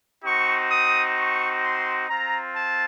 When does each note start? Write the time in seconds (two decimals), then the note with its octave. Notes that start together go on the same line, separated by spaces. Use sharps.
0.23 C4 D#4 F#4 C#6
0.70 D#6
1.17 C#6
1.62 C6
2.08 C4 F4 A#5
2.55 A5